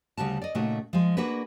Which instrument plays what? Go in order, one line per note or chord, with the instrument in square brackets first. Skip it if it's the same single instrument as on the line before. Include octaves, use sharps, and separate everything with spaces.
[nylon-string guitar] D2 C#3 G3 F#4 A5
D5 D#5
A#2 C#3 A3 D#4 F#4
F3 G#3
A#3 D4 F#4 G#4 B4